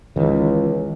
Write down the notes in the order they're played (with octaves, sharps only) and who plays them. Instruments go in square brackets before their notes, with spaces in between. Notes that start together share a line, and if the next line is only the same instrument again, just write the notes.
[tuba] C#2 [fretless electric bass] D#3 E3